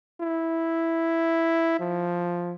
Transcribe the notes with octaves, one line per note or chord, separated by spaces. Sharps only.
E4
F3